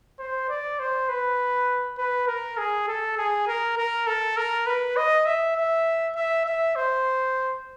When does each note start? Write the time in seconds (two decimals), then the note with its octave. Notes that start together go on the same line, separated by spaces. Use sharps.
0.19 C5
0.49 D5
0.79 C5
1.09 B4
1.98 B4
2.27 A#4
2.57 G#4
2.88 A4
3.17 G#4
3.47 A#4
3.77 A#4
4.07 A4
4.37 A#4
4.66 B4
4.96 D#5
5.25 E5
5.56 E5
6.16 E5
6.45 E5
6.75 C5